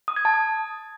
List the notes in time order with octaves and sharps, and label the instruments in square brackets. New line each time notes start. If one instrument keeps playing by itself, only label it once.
[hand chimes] D#6
G#6
A5
D#6